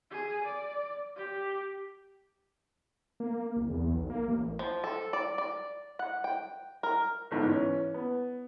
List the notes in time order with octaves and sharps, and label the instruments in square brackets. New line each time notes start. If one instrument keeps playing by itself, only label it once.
[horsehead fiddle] G#4
D5
G4
[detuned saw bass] A#3
C2
E2
B1
A#3
A1
[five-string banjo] F3
A4
D5
D5
F#5
G5
A#4
[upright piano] G1 G#2 E3
E3 C#4
B3